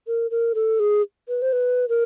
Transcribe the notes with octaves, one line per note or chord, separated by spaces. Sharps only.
A#4
A#4
A4
G#4
B4
C5
B4
A#4